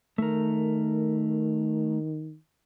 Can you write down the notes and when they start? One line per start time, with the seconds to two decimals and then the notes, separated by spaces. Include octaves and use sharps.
0.18 D#3 A3 A#4